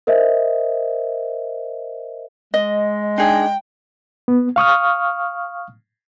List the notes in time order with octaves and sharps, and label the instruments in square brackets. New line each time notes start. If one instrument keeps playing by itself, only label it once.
[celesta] A#4 C5 D#5 E5
[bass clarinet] G#3 [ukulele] D#5
[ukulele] D4 D#4 G#4 [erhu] G5
[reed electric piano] B3
F5 C#6 D#6 F6